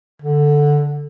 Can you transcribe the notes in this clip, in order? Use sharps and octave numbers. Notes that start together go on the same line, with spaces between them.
D3